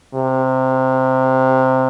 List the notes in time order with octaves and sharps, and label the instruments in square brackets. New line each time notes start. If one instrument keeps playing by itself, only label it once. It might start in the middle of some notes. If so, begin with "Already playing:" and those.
[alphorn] C3